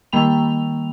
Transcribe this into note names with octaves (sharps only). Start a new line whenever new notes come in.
D#3 G3 A#3 G5 B5 F7